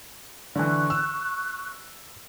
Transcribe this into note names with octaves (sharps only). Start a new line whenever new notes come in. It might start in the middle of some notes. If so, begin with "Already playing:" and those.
D3 E3 C#6 F#6
E6